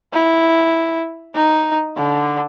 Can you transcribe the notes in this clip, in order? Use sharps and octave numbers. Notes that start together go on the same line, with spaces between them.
E4
D#4
D3